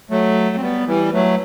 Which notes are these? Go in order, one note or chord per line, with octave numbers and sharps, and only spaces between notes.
F#3 A3
C4
G3 B3
E3 G3
F#3 A3